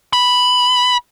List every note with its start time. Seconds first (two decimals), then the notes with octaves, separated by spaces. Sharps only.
0.13 B5